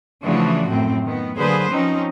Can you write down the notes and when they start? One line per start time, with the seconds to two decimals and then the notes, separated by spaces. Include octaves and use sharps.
0.23 C#3 E3 F3 A3 D4 F#4
0.69 F#2 A2 C4
1.05 D#3 B3
1.37 D3 F#3 A#3 G#4 B4 C5
1.69 F3 C4 C#4 D#4